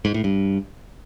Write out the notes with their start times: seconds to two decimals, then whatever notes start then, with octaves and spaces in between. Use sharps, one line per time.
0.05 G#2
0.14 A2
0.24 G2